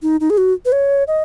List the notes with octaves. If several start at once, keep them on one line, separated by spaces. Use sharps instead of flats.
D#4
D#4
G#4
F#4
B4
C#5
D#5